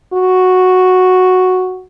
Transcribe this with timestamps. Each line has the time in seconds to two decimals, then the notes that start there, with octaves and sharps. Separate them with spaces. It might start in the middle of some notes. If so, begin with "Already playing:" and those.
0.14 F#4